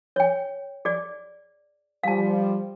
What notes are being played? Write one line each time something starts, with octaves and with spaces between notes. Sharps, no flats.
C#5 G5
G#4 D5
F3 G3 F5 A5